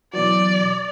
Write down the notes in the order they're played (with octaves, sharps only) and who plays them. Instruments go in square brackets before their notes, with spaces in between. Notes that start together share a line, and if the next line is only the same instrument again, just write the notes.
[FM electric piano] B2 E3 F#3 [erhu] D5